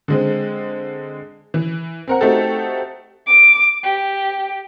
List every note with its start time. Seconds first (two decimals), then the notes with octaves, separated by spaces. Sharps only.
0.08 D3 G#3 C4
1.54 E3
2.08 C4 A#4 F#5
2.21 A3 C4 D#4 F#4 G4 A4
3.26 D6
3.83 G4